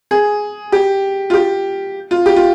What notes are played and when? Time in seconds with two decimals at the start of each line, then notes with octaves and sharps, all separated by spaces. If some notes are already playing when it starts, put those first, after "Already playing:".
0.11 G#4
0.72 G4
1.30 F4
1.34 G4
2.11 F4
2.26 G4
2.36 F4